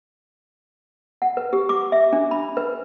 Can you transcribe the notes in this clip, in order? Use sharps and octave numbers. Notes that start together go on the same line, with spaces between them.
F#5
B4
G4
D6
E5
D4
B5
B4